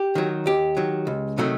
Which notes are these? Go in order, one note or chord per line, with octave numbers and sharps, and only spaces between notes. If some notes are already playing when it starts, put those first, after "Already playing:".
Already playing: G4
D#3 F#3
D#2 G4
D#3 F#3
C#2
C3 D#3 F#3 A3